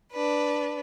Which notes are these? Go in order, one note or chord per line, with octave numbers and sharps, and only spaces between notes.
D4 B4